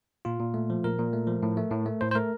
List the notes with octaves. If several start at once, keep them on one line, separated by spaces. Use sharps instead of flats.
A#2 F4
A#2
A3
F3
A#2 A#4
A#2
A3
F3
A2
A3
A2
A3
A2 C5
C5
A3 A#4